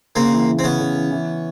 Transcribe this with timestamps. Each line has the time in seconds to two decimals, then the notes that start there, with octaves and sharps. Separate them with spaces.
0.15 C#3 A#3 C4
0.32 E3
0.48 E3
0.59 C4
0.64 C#3 B3 C#4
0.80 C#3
0.95 E3
1.11 E3